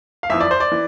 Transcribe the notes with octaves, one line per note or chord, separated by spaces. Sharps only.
F5
G1 F2 E3 E5
D5
C5
D5
E3